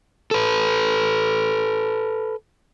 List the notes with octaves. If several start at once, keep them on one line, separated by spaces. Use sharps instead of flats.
A4 B4